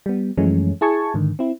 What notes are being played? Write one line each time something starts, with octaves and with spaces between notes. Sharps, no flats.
G3 B3
F#2 E3 F3 G#3 A3 C#4
E4 G#4 A5 C#6 G#6
G#2 D3 D#3
C4 E4